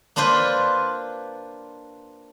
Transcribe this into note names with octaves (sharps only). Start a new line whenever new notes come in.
A#3 D4 F4 B4 C5